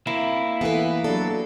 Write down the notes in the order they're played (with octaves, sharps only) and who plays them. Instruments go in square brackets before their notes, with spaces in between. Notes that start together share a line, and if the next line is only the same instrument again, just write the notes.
[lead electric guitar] A#3 E4 [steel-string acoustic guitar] C4
[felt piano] E3 A3 A4 [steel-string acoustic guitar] B3 B4
[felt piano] F#3 D4 [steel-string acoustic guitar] A4